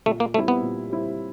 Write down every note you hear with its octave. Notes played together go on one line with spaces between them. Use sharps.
A#2 A3
A#3
G3 A3 C4 E4
B3
A#2
G3 C4 E4